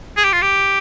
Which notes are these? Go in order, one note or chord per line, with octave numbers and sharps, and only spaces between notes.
G#4
G4
F4
G4